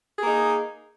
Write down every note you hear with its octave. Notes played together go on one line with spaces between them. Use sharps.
A#3 D#4 G#4